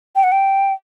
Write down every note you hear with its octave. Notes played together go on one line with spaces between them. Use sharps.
G5
F#5
G5